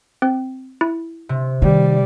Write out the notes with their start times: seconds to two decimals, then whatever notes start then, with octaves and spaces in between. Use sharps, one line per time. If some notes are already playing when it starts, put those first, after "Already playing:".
0.22 C4
0.81 E4
1.29 C3
1.62 D#3 G3 D5